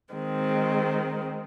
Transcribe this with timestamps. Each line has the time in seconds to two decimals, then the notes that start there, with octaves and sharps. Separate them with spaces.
0.15 D#3 G#3 C4